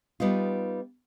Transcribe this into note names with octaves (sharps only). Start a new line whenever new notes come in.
G3 B3 D#4 F4